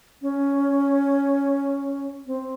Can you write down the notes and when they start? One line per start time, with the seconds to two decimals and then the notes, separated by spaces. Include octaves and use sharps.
0.22 C#4
2.27 C4